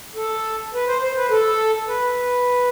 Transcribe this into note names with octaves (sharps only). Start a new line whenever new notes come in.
A4
B4
C5
C5
B4
A4
B4